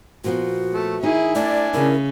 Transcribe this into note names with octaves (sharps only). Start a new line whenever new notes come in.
A#2 F3 B3 F#4
A3
D#3 D#4 E4 G#4
A3 D4 D5 G#5
C#3 E4 A#4